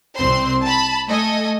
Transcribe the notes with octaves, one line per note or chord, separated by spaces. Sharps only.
C2 C4 C5 C6
A5 B5
A3 A4 D#5 G#5